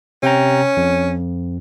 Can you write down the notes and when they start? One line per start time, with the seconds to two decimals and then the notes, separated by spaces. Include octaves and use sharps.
0.23 C3 C#4 G5 A#5
0.77 F2